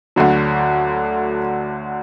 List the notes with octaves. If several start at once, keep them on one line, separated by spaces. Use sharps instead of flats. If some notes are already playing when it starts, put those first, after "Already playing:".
D2 D3 F#3